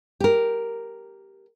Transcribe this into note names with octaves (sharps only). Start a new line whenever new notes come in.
G4 A#4